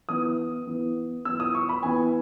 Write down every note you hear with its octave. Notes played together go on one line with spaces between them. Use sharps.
E3 B3 D#6
E3 B3
E3 B3 E6
D#6
C#6
B5
E3 B3 G#5